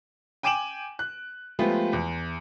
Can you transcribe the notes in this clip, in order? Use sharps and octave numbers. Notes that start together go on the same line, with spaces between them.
G5 G#5 D6 D7 E7 F#7
F#6
F3 G#3 A3 B3 F4 G4
E2